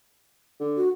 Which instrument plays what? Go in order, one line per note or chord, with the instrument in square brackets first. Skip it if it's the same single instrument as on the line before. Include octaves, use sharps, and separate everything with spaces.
[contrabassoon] D3
[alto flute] F#4